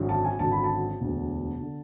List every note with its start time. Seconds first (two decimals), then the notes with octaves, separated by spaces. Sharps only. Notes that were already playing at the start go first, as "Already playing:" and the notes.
Already playing: G#1 F#2 D3
0.09 A5
0.25 G#5
0.39 G#1 F#2 D3 A5
0.52 B5
0.64 A5
1.00 E1 D2 D3
1.61 D3